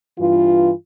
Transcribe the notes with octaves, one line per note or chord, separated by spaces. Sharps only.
G2 E3 F4